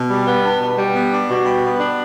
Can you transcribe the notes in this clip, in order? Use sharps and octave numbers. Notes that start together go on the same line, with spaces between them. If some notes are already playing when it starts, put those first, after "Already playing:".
Already playing: B2
G3
B3
D4
B2
G3
B3
D4
B2
G3
B3
D4